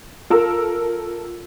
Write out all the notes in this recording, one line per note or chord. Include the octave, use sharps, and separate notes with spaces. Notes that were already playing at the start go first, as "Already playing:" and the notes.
F4 A4 A#4 E6